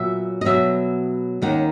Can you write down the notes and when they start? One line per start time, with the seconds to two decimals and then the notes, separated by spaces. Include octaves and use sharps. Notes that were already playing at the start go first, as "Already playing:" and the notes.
Already playing: A#2 F#3 B3 E5
0.41 D#5
0.45 B2 F#3 B3 E5
1.42 D#2 D#3 A#3 C#4 F#5